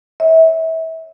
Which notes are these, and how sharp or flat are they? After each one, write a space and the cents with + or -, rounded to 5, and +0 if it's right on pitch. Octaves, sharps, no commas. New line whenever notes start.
C#5 +0 E5 -25